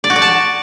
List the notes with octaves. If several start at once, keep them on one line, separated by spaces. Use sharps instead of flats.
D5
F#4
D5
A5